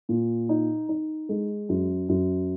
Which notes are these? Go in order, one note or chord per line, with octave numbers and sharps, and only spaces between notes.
A#2
D#4
D#4
G#3
F#2
F#2